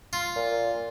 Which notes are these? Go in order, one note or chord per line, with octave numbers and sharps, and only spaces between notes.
F4
A#2